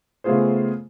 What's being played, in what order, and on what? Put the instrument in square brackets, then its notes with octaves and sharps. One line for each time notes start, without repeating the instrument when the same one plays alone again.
[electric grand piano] C#3 A3 B3 F4 G#4 C5